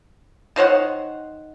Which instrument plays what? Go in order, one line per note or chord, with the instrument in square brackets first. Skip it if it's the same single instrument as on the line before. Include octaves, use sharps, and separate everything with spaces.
[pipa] D#3 C5 C#5 F#5